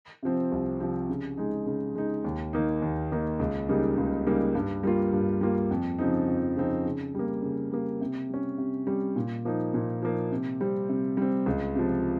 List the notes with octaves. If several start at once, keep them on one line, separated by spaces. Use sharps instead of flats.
C3 F3 C4
C2
C3 F3 C4
C#3
G#3 D#4
C#3
G#3 D#4
D#2
D#3 A#3 D#4
D#2
D#3 A#3 D#4
C#2
C#3 G3 A#3 D#4
C#2
C#3 G3 A#3 D#4
G2
G3 A#3 F4
G2
G3 A#3 F4
F2
C#3 F3 C4 D#4
F2
C#3 F3 C4 D#4
C#3
G3 A#3
C#3
G3 A#3
C3
G3 C#4
C3
G3 C#4
A#2
F3 A#3 D#4
A#2
F3 A#3 D#4
C3
G3 C4
C3
G3 C4
C#2
C3 F3